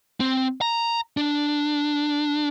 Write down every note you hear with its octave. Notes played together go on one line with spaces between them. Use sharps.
C4
A#5
D4